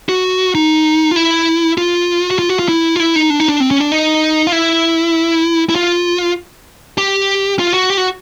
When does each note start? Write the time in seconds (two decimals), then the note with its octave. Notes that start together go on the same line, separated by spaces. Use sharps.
0.09 F#4
0.55 D#4
1.11 F4
1.16 E4
1.78 F4
2.31 F#4
2.39 F4
2.49 F#4
2.59 F4
2.69 E4
2.96 F4
3.00 E4
3.16 D#4
3.30 D4
3.40 D#4
3.48 D4
3.60 C4
3.71 C#4
3.80 D4
3.92 D#4
4.47 F4
4.52 E4
5.69 E4
5.76 F4
6.98 G4
7.59 F4
7.74 F#4
7.90 G4
7.97 F#4